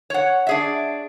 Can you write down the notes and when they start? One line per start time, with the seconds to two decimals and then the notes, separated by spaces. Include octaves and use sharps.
0.10 C#5 F#5
0.47 D4 G#4 E5